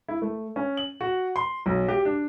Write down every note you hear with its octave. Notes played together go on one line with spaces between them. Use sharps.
E4
A3
C#4
F#7
F#4
C6
B1
G4
D4